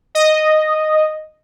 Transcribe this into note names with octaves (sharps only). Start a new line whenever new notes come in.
D#5